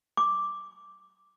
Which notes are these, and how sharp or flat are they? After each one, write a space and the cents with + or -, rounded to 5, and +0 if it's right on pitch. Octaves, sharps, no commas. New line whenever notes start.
D6 +0